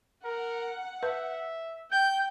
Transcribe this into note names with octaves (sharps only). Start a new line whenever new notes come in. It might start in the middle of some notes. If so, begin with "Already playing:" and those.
A#4 F#5
B4 E5
G5 G6